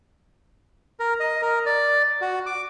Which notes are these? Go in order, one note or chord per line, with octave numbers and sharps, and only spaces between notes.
A#4
D#5
A#4
D5
F#4
D6